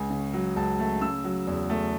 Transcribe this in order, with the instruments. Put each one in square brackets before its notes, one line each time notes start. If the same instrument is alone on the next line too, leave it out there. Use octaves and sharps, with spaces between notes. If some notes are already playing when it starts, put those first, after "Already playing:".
Already playing: [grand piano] C#2 G#5
C#3
F#3
C#2 A5
A3
C#3 E6
F#3
E2
A3